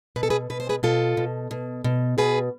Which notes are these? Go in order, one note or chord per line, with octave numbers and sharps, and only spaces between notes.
B2 B4
A4
G#4 B4
B2 B4
C5
G#4 B4
B2 F4 A4
B2
B2
B2
B2 G#4 B4